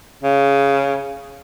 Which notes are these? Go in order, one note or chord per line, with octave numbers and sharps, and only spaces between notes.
C#3